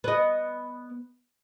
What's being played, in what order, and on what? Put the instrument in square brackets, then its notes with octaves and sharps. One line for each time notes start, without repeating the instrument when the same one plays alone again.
[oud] B3 D#5